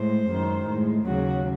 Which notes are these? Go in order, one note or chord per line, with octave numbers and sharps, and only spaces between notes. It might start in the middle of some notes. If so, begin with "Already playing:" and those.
Already playing: A2 G#3 C5
F#2 D#3 G#3
A2 G#3
D#2 C#3 F#3 F#4